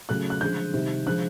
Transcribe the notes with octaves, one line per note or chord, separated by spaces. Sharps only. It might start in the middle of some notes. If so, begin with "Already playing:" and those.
C#3 F#3 A3 F#6
F#6
D3 F3 G#3 G6
C3 D#3 G3
D3 F3 G#3 F#6